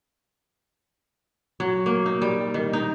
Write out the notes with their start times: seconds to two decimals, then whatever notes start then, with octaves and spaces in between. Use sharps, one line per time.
1.60 F#3
1.86 A#3
2.06 D#4
2.22 G3
2.54 D#3
2.73 D#4